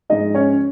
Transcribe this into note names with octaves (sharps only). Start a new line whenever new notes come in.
G#2 F3 G#3 D#4 D#5
C#4 C#5